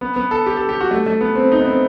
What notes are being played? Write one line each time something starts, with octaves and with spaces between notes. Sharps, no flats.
B3
B3
A4
G4
A4
G4
F#4
A3
A3
B3
C4
D#4
B3
C4